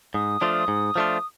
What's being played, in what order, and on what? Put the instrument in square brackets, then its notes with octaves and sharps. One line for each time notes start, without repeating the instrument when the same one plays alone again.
[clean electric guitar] G#2 [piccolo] D#6
[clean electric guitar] F3 A3 D4 F4
G#2
F3 A3 D4 F4